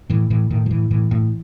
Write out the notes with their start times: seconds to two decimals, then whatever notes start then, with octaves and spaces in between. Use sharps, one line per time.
0.10 A2 E3
0.30 A2 E3
0.50 A2 D#3
0.66 F3
0.71 A2 E3
0.91 A2 E3
1.11 A2